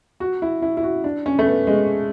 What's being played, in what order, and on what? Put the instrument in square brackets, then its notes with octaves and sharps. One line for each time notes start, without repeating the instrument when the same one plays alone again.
[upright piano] F#4
E4
E4
E4
F#4
D4
C#4
A3
B3
G#3